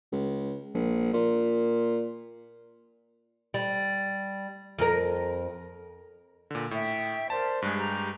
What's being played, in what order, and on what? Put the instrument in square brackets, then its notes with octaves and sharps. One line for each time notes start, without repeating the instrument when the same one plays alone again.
[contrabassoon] C#2
A#1
A#2
[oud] G3
F2 A#4
[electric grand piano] A#2 D3
[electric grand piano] A2 [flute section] E5 G5
[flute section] A#4 C5 D5 [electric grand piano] A5
[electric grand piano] G2 G#3 [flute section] G#4 F#6
[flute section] G4 A#5